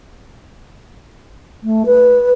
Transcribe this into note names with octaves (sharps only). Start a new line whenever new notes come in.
A3
B4